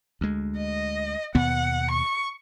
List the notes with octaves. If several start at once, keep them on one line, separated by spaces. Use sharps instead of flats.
D2 G#3
D#5
D#2 B2 B3 F#5
C#6